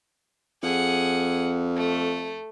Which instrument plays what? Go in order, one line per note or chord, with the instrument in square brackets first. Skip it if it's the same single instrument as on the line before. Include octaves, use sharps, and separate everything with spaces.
[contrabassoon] F2 [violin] G#4 F#5
[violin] A3